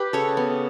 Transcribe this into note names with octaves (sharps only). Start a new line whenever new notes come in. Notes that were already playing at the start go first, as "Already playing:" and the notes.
Already playing: G4 B4
C#3 A4 C#5
B3